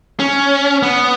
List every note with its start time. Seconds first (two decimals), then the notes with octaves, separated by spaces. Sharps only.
0.20 C#4
0.83 B3